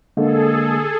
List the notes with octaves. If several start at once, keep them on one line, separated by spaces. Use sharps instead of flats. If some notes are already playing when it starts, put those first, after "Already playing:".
D3 G#3 A#3 G#4 A4